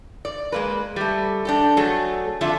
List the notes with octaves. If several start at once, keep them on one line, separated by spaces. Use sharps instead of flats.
D5
G#3 A#3 B4
G3 A3
D4 G4 A4
F#3 A3 G#4
F2 D3 A3 D4 F4 E5